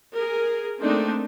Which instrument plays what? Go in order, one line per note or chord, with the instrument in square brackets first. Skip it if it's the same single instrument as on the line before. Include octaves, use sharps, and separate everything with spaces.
[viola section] G#4 A#4
A3 A#3 C4 D4 D#4